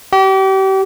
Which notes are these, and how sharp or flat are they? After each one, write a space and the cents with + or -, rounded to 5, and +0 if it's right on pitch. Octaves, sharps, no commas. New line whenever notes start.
G4 -35